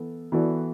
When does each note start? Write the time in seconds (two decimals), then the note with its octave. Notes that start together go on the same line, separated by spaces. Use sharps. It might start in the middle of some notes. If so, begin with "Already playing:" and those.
Already playing: E3 B3 A4
0.32 E3 B3 F#4 A4 D5